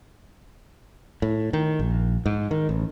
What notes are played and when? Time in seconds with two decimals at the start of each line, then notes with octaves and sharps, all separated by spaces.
1.22 A2
1.53 D#3
1.79 A#1
2.26 G#2
2.51 D#3
2.69 A1